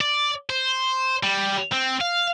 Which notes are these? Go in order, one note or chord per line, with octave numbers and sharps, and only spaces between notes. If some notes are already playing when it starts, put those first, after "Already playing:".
D5
C5
G3
C4
F5